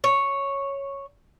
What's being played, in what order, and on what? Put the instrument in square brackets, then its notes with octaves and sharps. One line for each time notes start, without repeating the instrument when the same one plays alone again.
[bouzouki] C#5